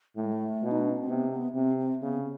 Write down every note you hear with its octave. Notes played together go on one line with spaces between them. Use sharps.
A2 A3
G#3
A3
B2
D#4
D4
C#4
C4
C3 B3
B3
C3 C4
C4
C#3 B3